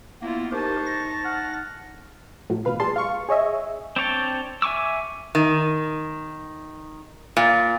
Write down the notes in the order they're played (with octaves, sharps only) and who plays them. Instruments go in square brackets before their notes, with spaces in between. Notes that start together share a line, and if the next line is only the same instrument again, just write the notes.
[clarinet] A#3 [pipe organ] B3 [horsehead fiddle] E4 F4
[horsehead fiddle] D#4 A5 [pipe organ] G4 A#4 [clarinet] C5 [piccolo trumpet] C#6
[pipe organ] A#6
[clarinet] F#5 [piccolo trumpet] F6
[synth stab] A2 F3 F#3
A1 B2 B4 F5
A#2 G3 G#4 A5 C6
F5 C#6
G#4 C#5 D#5 E5
[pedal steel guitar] C4 D4 C#5 G5 A5
E5 G#5 C#6 D6 E6
[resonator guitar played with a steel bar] D#3
A#2